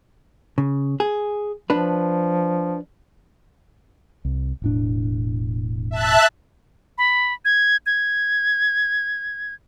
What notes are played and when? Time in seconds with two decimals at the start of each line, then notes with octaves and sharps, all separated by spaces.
0.58 C#3
1.00 G#4
1.70 F3 D4 B4
4.25 C2
4.62 E1 A2 D4
5.91 E5 A5 F#6
6.98 B5
7.45 G#6
7.86 G#6